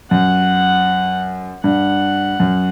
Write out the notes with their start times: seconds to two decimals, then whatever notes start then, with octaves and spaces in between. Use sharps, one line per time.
0.11 F#2 F#5
1.64 G2 F#5
2.40 F#2